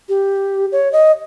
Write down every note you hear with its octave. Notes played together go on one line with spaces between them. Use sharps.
G4
C#5
D#5